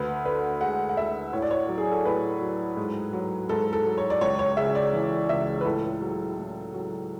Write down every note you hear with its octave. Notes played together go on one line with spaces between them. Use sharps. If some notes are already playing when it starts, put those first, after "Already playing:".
Already playing: D2 B4
D3 B4
G#3 F#5
F#5
D2 E5
A2 C#5
D5
C#5
F#3
G#4
A4
A2 B4
F#3
G#2
F#3
G#2 A4
A4
F#3
C#5
D5
C#2 C#5
C#5
C#3 E5
D5
E3
C#2 E5
B4
A2 A4
F#3
A2
F#3